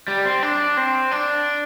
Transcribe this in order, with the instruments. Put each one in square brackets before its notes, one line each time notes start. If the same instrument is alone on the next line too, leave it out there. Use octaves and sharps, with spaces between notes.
[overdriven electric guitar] G3
C4
D4
C4
D4